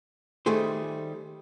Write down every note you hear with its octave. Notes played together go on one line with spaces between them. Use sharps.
D#3 G3 A3 G#4 C5